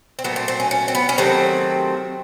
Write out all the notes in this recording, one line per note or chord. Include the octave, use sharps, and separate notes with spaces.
C4
A#2 F#3 A3 B3
C4
C4
C#4
C#4
C4
B3
C#4
C3 D#3 F#3 A3 C4